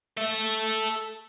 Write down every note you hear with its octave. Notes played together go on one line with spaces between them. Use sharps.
A4 E5